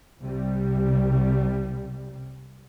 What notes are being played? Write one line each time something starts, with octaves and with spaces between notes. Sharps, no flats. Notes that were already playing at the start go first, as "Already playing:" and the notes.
C2 C3 G3